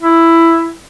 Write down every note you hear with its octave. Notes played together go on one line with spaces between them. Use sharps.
E4